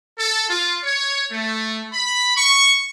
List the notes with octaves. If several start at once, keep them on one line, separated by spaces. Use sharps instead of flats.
A4
F4
C#5
A3
B5
C#6